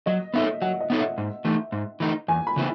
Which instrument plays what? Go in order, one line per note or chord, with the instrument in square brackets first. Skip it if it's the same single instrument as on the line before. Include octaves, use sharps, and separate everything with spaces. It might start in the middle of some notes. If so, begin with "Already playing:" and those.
[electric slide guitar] F#3 [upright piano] D#5
[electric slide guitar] B3 D#4 A4 C#5 [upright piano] E5
[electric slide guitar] F#3 [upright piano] F#5
[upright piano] D#5
[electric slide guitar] B3 D#4 A4 C#5
[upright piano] E5
[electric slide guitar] G#2
E3 A3 D#4
G#2
E3 A3 D#4
[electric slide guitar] E2 [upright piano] G#5
[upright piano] B5
[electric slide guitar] C#3 E3 B3 E4